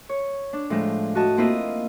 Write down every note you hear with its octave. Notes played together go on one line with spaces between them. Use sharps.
C#5
D4
A2 F3 G#3
F#4 D#5 A5
A#3 C4 E4 F4 D#5